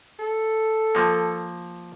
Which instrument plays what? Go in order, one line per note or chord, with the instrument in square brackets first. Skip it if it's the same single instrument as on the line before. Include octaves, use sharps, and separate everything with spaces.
[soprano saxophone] A4
[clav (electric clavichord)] F3 A#3